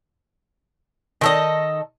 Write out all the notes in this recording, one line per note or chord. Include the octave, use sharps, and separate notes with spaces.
D#3 A4 D#5